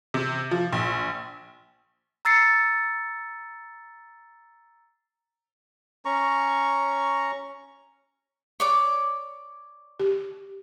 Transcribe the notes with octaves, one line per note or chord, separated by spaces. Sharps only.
C3
F3
A#1
A#5 E6 A6 C7 C#7
C#4 A#5 C#6
C#5 D5 D6
G4